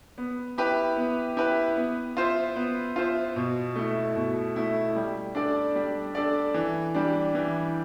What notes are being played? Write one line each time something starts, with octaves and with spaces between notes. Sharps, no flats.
B3
E4 G4 B4
B3
E4 G4 B4
B3
F4 C5 E5
B3
F4 C5 E5
B2
A3 E4
B2
A3 E4
G3
D4 A4 D5
G3
D4 A4 D5
E3
G3 D4
E3